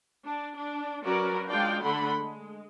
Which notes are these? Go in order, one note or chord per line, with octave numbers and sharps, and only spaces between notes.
D4
D4
F#3 C#4 F#4 A#4 B4 D5
G#3 D4 F4 D5 F5 G5
D3 A3 D4 F#5 B5 C6
G#3